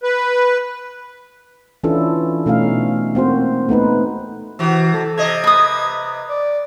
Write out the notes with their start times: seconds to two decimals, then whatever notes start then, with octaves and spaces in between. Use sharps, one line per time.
0.03 B4
1.83 E3 C#4 D4 E4 F4 A4
2.46 B2 A3 C#4 D#4 F5
3.15 A#3 C4 F#4 C5
3.69 A3 B3 D#4 B4
4.59 C3 E3 F#4
4.94 A4
5.18 C3 D#5 G#6
5.44 B4 D#6
6.28 D5